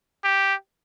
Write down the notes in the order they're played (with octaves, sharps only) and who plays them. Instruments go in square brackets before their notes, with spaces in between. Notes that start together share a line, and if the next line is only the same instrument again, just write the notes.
[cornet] G4